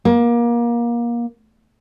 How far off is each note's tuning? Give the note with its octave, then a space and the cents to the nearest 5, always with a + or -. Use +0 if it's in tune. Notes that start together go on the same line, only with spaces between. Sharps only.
A#3 +25